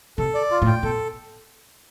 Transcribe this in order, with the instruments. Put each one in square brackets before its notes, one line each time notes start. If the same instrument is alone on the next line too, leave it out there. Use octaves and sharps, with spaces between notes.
[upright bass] C3 [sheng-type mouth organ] A4
[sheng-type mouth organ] D5
F4
[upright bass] A2
[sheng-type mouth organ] G5
[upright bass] B2 [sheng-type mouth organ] A4